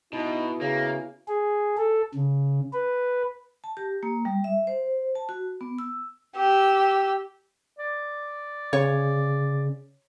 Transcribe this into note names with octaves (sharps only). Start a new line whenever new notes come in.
B2 B3 D#4 E4 F#4
C#3 A#3 G#4
G#4
A4
C#3
B4
A5
G4
A#3
G3
E5
C5
A5
F#4
B3
E6
G4 E6
D5
C#3 C#5